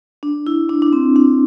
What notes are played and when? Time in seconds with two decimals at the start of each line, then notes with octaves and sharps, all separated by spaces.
0.23 D4
0.47 E4
0.69 D4
0.82 D4
0.93 C4
1.16 D4